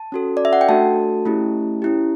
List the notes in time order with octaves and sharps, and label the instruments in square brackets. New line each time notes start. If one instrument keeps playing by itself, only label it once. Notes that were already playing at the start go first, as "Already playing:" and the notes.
Already playing: [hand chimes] A5
C#4 F#4 A4
D5
E5
F#5
G5
A3 D4 F#4 A4 A5
A3 C#4 E4 G4
C#4 E4 G4